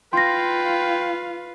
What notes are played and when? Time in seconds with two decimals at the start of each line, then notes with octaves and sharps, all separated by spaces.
0.13 F4 B4 F5 G5 C6 A#6